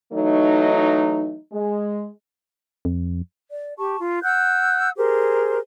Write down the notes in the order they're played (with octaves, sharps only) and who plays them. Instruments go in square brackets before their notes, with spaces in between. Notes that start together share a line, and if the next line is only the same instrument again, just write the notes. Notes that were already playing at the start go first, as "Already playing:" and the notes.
[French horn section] E3 F#3 A3 D#4
G#3
[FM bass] F2
[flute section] D5
G4 A5 C#6
F4
F#5 E6 F#6 G6
G4 G#4 A#4 C5